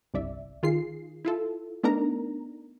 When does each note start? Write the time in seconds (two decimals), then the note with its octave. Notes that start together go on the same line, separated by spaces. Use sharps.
0.14 G1 C2 D5 E5
0.63 D#3 F4 G#4 C7
1.25 E4 F4 A4
1.83 A3 B3 D4 D#4 A#4 A#5